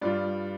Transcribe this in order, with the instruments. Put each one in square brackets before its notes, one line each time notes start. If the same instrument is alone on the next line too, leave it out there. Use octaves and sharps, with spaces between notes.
[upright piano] G2 G3 F4 D5